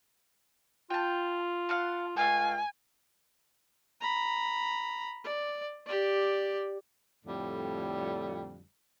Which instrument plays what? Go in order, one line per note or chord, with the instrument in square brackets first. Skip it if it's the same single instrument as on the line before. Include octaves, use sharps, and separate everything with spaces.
[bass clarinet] F4 [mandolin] G5 A5
[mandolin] F5 F#5 A5
[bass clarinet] C#2 [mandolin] A3 F5 G5 [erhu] G#5
[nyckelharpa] A#5 B5
D5
G4 D5
[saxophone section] F2 A2 D3 G3